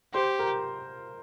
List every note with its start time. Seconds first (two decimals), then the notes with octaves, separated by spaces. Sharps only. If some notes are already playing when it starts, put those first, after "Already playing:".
0.14 G4 C5 C6
0.39 A#4 A#5